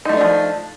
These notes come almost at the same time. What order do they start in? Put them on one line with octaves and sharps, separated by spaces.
D#4 A3 F4 D4 F3